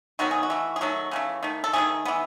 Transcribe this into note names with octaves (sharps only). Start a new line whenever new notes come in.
D#3 F#3 B3 F#4
G#4
F#4
E3 A3
G#4
D#3 F#3 A3 F#4
C#3 E3 A3
D#3 A3
A4
D#3 F#3 A3 G#4
E3 B3